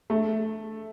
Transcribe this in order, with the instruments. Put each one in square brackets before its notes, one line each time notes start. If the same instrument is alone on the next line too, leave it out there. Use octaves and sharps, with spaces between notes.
[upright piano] A3